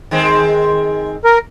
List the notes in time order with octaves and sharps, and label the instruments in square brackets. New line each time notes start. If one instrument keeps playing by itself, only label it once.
[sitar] D#3 G#3 C4
[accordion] A#4